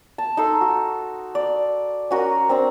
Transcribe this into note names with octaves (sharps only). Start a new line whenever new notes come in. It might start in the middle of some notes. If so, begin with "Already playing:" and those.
A5
D#4 A4 C6
F#4
D5
C#4 F#4 A#4 D#5
C4 D4 A#5